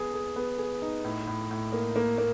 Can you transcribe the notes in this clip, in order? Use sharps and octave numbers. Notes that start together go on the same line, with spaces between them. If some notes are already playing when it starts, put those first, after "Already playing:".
Already playing: B3 G#4
G#4
B3
G#4
D#4
A2
A2
A2
A#3
A#3
A#3